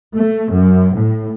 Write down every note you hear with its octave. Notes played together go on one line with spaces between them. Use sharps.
A3
F#2
A2